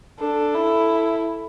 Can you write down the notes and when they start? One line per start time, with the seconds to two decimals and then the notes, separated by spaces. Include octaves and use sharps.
0.19 D4 A4
0.55 E4